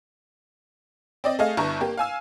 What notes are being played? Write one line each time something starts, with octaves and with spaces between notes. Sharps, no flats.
C4 D5 D#5
A3 G#4 D#5 F5
G1 G2 E4 A#5 C#6
A#3 G4
F5 G#5 E6